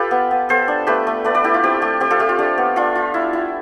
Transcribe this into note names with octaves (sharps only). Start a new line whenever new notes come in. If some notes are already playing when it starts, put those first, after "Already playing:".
Already playing: F4 G4 A4 B4 F5
B3
B3
B3 A4 C5
D4
A3 G4 B4
A3
A3 B4 D5
B4 D5
E4 G4
F4
C4 G4
A3 G4
C4 G4
F4 A4
A3 G4
F4
D4 G4
B3
D4 F4
F4
E4
E4